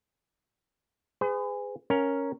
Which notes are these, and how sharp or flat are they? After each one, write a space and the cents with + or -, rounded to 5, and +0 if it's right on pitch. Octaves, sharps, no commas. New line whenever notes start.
G#4 -15 B4 +40
C#4 +0 A#4 +0 F5 +45